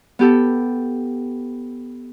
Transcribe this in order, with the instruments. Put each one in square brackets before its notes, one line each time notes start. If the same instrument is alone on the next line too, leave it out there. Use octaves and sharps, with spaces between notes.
[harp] B3 G4 A4